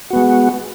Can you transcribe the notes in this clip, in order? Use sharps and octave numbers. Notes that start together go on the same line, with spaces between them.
G#3 B3 F#4